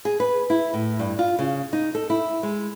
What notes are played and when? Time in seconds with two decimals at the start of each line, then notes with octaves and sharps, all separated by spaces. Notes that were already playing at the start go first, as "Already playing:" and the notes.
0.05 G#4
0.20 B4
0.50 E4
0.74 A2
0.99 G2
1.19 F4
1.39 C#3
1.73 D#4
1.95 A4
2.10 E4
2.43 G#3